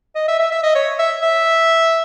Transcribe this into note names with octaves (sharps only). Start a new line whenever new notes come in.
D#5
E5
E5
E5
D#5
C#5
E5
E5